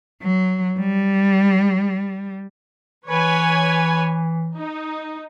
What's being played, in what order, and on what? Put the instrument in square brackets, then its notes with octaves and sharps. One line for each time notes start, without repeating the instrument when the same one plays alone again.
[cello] F#3
G3
[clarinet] E3 [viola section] B4 C#5 G#5
[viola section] D#4